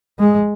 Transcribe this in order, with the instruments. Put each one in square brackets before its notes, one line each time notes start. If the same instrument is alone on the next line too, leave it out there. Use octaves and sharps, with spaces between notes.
[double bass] G#3